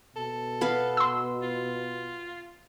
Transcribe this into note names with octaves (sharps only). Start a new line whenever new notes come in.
B2 A4
B3 B4 F5
C6 E6
F4